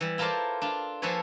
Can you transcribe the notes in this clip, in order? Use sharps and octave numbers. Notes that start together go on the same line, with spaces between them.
E3 G3
E4 F4 A4 A#4 C5 D5
D4 F4
F3 A#3 G#4 A4 B4 C#5